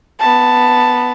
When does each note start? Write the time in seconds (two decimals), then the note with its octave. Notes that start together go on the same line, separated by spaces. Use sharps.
0.20 B3 A5